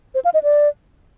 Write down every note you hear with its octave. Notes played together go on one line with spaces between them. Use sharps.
C5
F5
D#5
D5